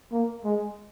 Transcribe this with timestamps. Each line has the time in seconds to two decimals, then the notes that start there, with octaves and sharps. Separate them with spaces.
0.12 A#3
0.45 G#3